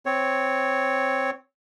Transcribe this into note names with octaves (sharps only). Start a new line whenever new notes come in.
C4 C#5